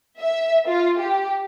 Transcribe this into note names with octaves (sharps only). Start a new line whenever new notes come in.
E5
F4
G4